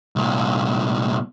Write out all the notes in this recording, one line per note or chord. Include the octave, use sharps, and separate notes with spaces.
C2 A#2